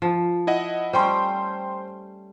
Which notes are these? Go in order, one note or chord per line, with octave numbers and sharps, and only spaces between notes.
F3
E4 D#5 F#5
G3 A3 C#4 C5 G5 C6